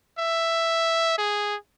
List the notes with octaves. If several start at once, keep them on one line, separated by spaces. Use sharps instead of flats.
E5
G#4